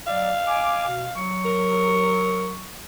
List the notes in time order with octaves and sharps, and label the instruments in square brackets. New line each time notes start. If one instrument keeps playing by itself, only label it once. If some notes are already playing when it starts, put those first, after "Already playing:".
[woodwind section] F#3 D5 [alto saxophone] F5
[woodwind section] G#5 D6
B2
F#3 C#6
[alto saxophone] A#4